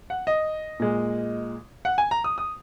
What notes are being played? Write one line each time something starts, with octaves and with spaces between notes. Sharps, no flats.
F#5
D#5
A#2 G#3
F#5
G#5
A#5
D#6
D#6